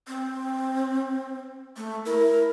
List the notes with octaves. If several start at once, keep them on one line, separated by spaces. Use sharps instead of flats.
C4
A3
E4 A#4